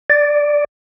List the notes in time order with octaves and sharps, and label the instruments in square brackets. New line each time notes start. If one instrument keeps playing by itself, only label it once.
[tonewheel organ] D5